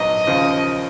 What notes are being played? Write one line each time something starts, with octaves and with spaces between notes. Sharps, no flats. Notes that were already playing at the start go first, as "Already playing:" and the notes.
Already playing: A#1 G#2 F#3 B3 D#4 D#5
D#2 C#3 F3